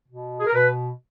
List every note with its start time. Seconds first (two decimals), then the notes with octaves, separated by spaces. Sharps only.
0.08 B2
0.39 G#4
0.47 A#4
0.54 B2 B4